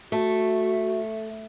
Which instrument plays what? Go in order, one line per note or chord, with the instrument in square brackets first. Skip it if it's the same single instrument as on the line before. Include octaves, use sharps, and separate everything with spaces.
[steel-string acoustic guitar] A3 [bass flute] F#4